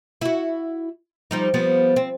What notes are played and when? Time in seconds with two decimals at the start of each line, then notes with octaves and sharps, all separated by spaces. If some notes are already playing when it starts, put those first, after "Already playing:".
0.21 E4 F#4
1.31 F3 G3 D#4
1.54 F3 G3 B3
1.96 C4